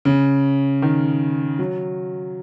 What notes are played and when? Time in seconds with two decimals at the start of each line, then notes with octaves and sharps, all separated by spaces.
0.05 C#3
0.82 D#3
1.59 F#3